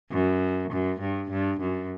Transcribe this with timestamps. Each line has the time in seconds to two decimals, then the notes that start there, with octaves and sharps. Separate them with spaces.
0.11 F#2
0.71 F#2
1.01 G2
1.30 G2
1.60 F#2